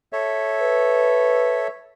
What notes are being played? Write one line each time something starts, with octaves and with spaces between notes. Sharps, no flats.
A4 C#5 E5
B4